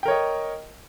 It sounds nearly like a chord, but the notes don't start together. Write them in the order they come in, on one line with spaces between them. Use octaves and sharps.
G5 A#4 C#5 D#5